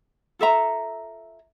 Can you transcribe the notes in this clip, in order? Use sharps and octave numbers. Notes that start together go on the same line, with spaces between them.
F4 A4 E5 A#5